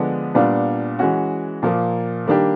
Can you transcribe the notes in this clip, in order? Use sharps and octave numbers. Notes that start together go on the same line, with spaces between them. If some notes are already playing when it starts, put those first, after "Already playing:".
Already playing: D3 F3 G#3 B3 D4
A#2 G3 B3 D4 F4
E3 G#3 C#4 F#4
A#2 F3 A#3
D#3 G3 A#3 D4 G4